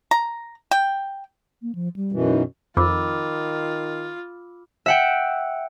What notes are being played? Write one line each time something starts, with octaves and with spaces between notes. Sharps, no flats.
A#5
G5
A#3
F3
G3
F#2 B2 E3
D#4
F2 D#3 F4 B5 D6 E6
E5 F#5 G5